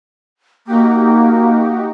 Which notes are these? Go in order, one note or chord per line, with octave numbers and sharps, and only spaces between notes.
A#3 D#4 F#4 G4